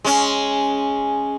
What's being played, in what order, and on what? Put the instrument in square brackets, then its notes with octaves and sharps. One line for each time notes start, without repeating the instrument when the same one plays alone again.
[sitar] G#3 C#4